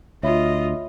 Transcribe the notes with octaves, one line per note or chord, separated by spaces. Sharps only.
D2 F4 C#5 D#5 E5 B5